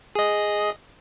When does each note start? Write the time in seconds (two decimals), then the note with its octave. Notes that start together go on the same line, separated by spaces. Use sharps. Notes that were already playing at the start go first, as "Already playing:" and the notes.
0.15 G#4 D#5